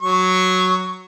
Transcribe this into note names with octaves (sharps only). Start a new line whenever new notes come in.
F#3 C#6